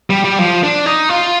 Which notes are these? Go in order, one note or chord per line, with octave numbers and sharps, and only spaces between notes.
G3
G3
F3
D4
D#4
F4